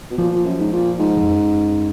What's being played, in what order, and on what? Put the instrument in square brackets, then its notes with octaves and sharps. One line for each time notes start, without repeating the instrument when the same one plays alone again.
[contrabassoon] B2
[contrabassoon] A#2 [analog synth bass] F3
[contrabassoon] A#2
F#2
G#2
A#2
G#2
[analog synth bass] F2
F#2